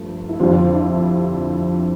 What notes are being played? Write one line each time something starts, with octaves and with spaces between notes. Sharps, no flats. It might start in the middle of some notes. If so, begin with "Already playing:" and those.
Already playing: G2 F3 A3
E4
F2 D3 F3 G3 F4
D4
E4